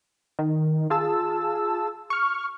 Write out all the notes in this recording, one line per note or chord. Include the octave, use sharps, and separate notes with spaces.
D#3
F4 G#4 A5 E6
C#6 F6